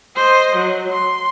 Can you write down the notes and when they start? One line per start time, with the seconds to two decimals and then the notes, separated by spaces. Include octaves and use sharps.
0.16 C5 D#5
0.56 F#3
0.91 C6